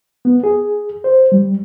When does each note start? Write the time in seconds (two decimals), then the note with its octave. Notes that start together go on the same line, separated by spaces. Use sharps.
0.25 B3
0.43 G#4
1.04 C5
1.32 G3